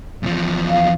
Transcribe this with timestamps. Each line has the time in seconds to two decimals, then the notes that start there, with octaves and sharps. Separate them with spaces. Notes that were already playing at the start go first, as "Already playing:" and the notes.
0.23 E2 F3
0.69 F5